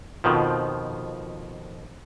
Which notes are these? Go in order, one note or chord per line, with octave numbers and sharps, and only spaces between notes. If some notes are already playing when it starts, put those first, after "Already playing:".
F2 B2 D#3 F3